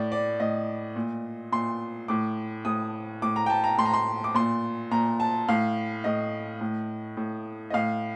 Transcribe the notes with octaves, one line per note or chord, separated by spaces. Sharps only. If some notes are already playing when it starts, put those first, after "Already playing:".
Already playing: A2 D5
D5
A2 D#5
A#2
A#2 C6
A2 D6
A2 D#6
A2 D6
A#5
G5
A5
A#5
A2 C6
A#5
C6
D6
A#2 C6
A#2 A#5
A5
A2 F5
A2 D#5
A2
A2
D#5
A2 F5